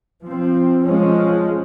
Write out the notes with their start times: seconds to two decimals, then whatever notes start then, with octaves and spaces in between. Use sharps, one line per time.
0.25 F3 C4
0.86 F3 G#3 C#4